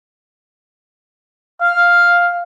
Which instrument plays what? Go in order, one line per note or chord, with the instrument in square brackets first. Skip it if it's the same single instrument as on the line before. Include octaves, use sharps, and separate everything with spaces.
[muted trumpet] F5 [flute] F6